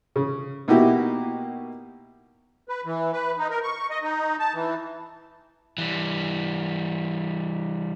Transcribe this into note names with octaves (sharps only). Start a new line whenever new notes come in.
C#3
B2 A#3 D#4 E4 F#4 G4
B4
E3
B4
D#4
A#4
C#6
D#5
D#4
A5
E3
E3 G3